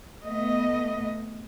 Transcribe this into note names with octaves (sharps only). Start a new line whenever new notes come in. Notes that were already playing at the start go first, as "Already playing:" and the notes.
A3 B3 D#5